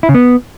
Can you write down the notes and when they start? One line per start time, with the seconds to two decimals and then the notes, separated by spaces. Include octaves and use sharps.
0.03 E4
0.09 C#3
0.15 B3